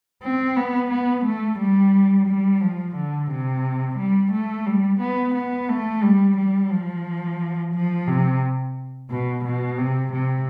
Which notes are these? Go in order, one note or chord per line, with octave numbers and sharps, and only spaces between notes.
C4
B3
B3
A3
G3
G3
F3
D3
C3
G3
A3
G3
B3
B3
A3
G3
G3
F3
F3
C3
B2
B2
C3
C3